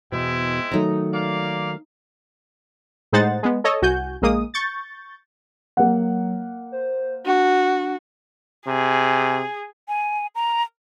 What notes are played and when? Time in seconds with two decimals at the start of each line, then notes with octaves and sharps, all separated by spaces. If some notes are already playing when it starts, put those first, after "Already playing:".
0.12 E2 B2 G#3 C4 E4
0.71 D#3 F#3 A3 D#4 A#5
1.13 A#3 D5 F5
3.13 A2 G#3 D#4 C5 F#5 A6
3.43 G#3 B3
3.64 A4 C#5 D#5
3.82 C2 F#4 G#5 G6
4.22 A#1 G#3 A#3 D#6
4.54 C#6 G6 A6
5.77 F#3 A#3 F#5
6.72 C5
7.26 D4 F#4
8.67 C3 G#4
9.88 G#5
10.35 A#5